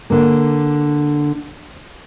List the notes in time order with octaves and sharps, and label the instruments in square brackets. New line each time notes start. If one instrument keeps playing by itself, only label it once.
[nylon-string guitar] D3 A#3